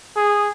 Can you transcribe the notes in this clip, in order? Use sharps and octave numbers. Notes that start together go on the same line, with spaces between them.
G#4